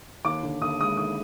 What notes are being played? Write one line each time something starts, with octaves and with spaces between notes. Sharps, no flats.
D#2 D6
D3
D#2 D#6
G#3 D#6
D#2 D#6